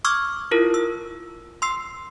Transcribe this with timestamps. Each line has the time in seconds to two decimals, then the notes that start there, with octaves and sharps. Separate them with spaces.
0.05 C#6 D6 E6 F6 G#6
0.51 E4 F4 A#4
0.74 E6
1.62 C6 E6 C7